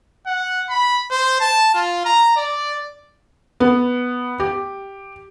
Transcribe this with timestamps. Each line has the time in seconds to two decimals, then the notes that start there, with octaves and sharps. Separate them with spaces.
0.26 F#5
0.69 B5
1.10 C5
1.40 A5
1.74 F4
2.05 A#5
2.36 D5
3.60 B3
4.40 G4